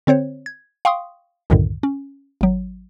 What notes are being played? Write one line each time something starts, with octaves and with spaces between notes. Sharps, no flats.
D3 C4 C5 C#5
G#6
F5 G5 C6 C#6 D#6
C2 F#2 A2 D3 D#3
C#4
G#1 F#3